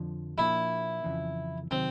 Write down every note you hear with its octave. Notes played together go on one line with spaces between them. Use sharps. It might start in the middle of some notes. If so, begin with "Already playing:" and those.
Already playing: F2 D3 F3
A#2 F3 A#3 D4 E4
F2 C#3 E3
C3 D#3 F#3 C4